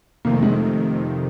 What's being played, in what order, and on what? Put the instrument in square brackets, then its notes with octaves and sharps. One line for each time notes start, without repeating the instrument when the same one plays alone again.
[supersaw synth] F2 C3 D#3 [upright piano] A#3
[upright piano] A3
G#3
A3